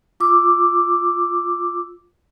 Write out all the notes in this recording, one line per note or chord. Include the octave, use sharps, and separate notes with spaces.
F4 D6 E6